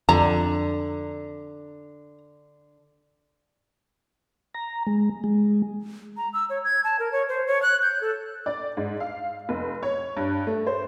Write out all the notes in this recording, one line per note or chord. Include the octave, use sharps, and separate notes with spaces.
F2 D3 A#5
A#5
G#3
G#3
A#5
E6
C#5
G#6
A5
A#4
C#5
C5
C#5
F#6
G6
A4
D5
G#2
F5
F1
C#5
G2
A3
C5